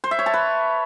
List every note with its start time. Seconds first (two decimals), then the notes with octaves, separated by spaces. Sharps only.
0.04 C5
0.11 E5
0.19 C#5
0.26 A5
0.34 B4